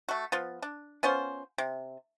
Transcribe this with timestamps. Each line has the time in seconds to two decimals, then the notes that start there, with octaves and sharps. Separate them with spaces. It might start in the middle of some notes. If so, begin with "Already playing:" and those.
0.09 A3 F#4
0.32 F3 B3 F4
0.62 D4
1.03 B3 C#4 F4 C5
1.58 C3